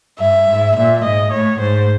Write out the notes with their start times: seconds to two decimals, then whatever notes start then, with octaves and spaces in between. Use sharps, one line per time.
0.19 G2 E5
0.48 G#2
0.76 A#2 E5
1.04 G#2 D#5
1.32 A2 C#5
1.60 G#2 C5